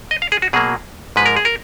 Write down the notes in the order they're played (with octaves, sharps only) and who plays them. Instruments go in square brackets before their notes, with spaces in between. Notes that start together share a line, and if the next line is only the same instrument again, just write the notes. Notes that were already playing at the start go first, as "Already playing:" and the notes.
[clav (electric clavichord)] D#5
F5
G#4
F#4
B2 F#3 A#3 G#4
G#2 F3 G#3 B4
A#4
G#4
A#4